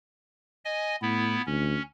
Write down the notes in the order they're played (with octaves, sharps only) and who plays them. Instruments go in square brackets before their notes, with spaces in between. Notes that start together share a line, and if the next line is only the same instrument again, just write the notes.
[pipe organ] D#5 G#5
[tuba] A2 [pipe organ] B3 E4
[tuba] D2 [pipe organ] C#4